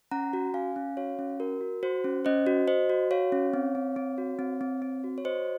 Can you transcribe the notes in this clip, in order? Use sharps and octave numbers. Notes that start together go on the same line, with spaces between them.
C#4 F#5 A#5
F#4
C#4 F5 G#5
C#4
F#4 C#5 F5
C#4
F#4 A#4
F#4
F#4 C5
C#4
C#4 C5 D#5
F#4
F#4 C5 D#5
F#4
F#4 C#5 F5
C#4
C4
C4
C4
F#4
C4
C4
C4
F#4
C#5
F#4 C5 D#5